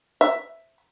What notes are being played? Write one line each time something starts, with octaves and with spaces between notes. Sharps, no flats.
E5